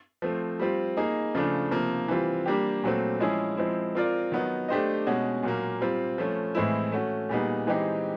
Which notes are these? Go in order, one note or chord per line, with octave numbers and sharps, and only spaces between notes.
F3 A3 C4
G3 C4 F4
A#3 D#4 G#4
C#3 F3 A3 D4
C3 F3 A#3
E3 G3 C4 F4
G3 A#3 D4 G4
A#2 F#3 A3 C4
F3 G#3 C#4 E4 G#4
F3 G#3 C4 E4
C4 F4 A#4 D5
D#3 F#3 B3 D#4
A3 D4 G4 C5 D#5
B2 G#3 C#4 F#4
A#2 F#3 A#3
G3 C4 F4
F3 A3 C#4
A2 E3 G#3 C4 E4
A3 C#4 F#4
A#2 G3 B3 D#4 G#4
E3 G#3 C4 D#4 G4